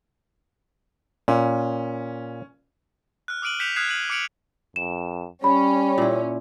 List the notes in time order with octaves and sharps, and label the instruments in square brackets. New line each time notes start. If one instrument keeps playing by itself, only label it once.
[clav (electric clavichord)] A#2 [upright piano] C#4
[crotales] F6 F#6
D6 D#6 F6 D7 D#7 F#7
F#6 G6 B6 C#7 E7 F7
D#6 F6 F#6 G#6 C7 E7
F6 D#7 F#7
D6 F6 C#7 D7 F7 F#7
[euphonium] F2 [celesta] E7
[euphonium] G3 [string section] C#4 [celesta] B5
[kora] A#2 E4